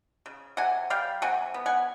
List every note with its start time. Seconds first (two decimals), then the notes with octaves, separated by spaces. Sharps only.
0.26 C#3
0.57 C3 F#5 G#5
0.90 G3 F5 G5
1.22 C3 F#5 G#5
1.54 B3
1.66 F#5 G#5